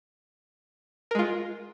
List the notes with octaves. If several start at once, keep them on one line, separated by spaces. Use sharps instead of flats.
G#3 F4 A#4